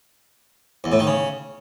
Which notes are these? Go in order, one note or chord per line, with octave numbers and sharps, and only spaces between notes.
E2
A2
D#3
C#3